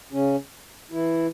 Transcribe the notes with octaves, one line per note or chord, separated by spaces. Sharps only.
C#3 C#4
E3 E4